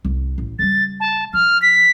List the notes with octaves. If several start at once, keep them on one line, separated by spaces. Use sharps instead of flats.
C2
A1
C#3 G3 A6
A5
F3 F6
B6